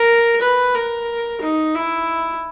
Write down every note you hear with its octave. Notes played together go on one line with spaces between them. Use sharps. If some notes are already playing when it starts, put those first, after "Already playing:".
Already playing: A#4
B4
A#4
D#4
E4